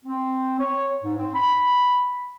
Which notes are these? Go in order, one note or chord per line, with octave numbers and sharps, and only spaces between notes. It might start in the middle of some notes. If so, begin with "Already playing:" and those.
C4
C#5
G#2
C4
B5